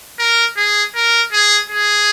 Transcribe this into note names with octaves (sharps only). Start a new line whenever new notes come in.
A#4
G#4
A#4
G#4
G#4